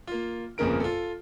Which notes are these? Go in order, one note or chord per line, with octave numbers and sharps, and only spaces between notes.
A#3 F4
G1 F2 A#2 C#3 A#4 D7
F4 A4